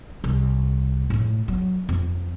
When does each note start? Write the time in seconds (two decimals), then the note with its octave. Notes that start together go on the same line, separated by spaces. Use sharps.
0.24 C2
1.10 A2 A3
1.48 F#3
1.89 F2